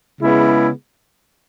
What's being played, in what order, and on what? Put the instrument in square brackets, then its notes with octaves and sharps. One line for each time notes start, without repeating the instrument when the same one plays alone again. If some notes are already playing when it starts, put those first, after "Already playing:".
[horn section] C#3 G#3 B3 E4